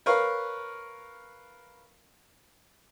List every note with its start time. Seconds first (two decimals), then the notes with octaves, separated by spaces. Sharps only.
0.06 A#4 B4 C#5 F5